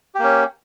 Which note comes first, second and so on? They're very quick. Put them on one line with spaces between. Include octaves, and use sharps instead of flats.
G4 A#3 C#4